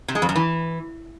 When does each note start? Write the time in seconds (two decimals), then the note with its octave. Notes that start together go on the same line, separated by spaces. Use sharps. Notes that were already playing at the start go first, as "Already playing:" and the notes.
0.08 C3
0.15 G#3
0.22 F2
0.29 F#2
0.36 E3